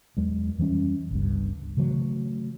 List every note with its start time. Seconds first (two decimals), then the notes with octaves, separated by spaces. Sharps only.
0.17 E2 F#3 G#3
0.58 F2 E3 G3 C#4
1.11 G1 C#2 G2
1.77 C#3 E3 F#3 A3